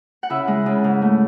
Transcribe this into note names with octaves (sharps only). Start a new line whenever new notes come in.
F#5
C#3 E4 E5
G#3
C#3
G#2
A3